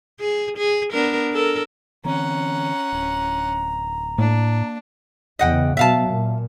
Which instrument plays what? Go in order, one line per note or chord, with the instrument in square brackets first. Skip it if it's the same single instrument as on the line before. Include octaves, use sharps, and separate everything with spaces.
[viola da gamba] G#4
G#4
B3 D4 A#4
A4 A#4
[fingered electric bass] D3 E3 C4 [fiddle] C#4 F#5 [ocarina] A#5
[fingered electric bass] D1
[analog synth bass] A2 [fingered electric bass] A#3 [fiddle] D4
[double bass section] E2 C#3 [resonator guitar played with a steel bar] D#5 F#5 G5
[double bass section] B2 F#3 [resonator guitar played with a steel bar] E5 F5 A5
[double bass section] A#2